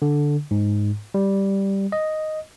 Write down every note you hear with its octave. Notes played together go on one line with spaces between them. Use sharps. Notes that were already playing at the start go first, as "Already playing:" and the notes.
D3
G#2
G3
D#5